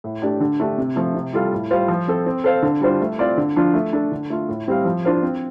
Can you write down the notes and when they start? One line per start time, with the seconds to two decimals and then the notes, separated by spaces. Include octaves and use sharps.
0.04 A2
0.22 A3 D4 G4 D5
0.41 D3
0.60 A3 D4 G4
0.78 C3
0.96 F3 A3
1.15 C3
1.33 G3 F4 A4 F5
1.52 A2
1.71 G3 F4 C5 F5
1.88 F3
2.08 C4 A4
2.26 C4
2.44 A4 C5 F5
2.63 D3
2.81 G3 D4 F4 C5
3.01 A3
3.19 C4 F4 D5 F5
3.37 D3
3.56 F3 D4 F4
3.74 A3
3.93 D4 A4
4.12 D3
4.30 A3 F4
4.49 A2
4.68 G3 C4 G4 F5
4.85 F3
5.05 D4 F4 C5 F5
5.22 C4